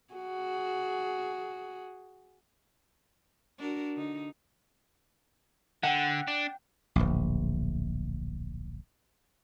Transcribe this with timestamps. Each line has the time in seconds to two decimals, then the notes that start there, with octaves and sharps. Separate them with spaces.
0.14 F#4 G#4
3.59 D4 F#4 A#4
3.96 D3 D#4
5.83 D3 F#5 G5
6.28 D4
6.96 D1 A#1